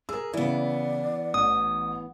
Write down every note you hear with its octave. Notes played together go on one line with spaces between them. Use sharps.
G#4 A#4 E6
C#3 E3 B3 E4 D5
A1 D#6